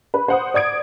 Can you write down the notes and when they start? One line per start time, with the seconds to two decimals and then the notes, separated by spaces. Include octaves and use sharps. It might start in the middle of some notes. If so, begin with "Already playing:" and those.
0.14 B4
0.28 C5 F#5 D#6
0.54 D5 D#6 G#6 D7